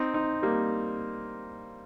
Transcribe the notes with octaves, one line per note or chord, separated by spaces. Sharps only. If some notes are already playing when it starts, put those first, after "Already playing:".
Already playing: C4 D#4
C4 D#4
G3 A#3